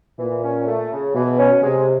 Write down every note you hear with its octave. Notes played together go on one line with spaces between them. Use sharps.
A#2 E3
C#4
A3
C#3
B2 E3
C#4
C3 G#3